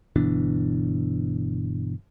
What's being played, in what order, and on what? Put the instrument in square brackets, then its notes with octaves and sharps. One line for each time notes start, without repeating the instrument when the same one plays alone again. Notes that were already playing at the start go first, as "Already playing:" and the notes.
[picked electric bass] G1 B2 E3 D4